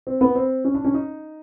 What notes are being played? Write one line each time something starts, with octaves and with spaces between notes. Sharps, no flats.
C4
B3
C4
C#4
D4
C#4
D#4